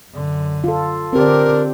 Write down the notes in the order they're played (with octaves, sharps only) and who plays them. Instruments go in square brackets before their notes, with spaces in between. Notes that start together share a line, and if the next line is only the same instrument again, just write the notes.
[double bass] F#2 D3
[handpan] F4 A4
[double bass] D3 D4 [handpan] C4 G4 [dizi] A#4